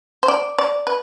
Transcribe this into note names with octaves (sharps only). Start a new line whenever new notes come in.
C5
D5
D5
B4